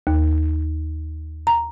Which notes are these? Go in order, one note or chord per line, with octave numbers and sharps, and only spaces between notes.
D#2
A#5